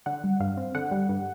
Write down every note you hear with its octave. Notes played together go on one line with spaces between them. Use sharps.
D3 F#5
G3
G2 F5
C4
D3 F#5
G3
G2